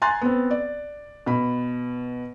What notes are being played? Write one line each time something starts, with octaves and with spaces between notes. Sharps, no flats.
G#5 A#5 C6 F#6 A6
B3 C4
D5
B2 B5